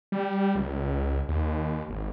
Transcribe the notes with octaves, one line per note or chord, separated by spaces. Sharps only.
G3
C#2
D#2
G#1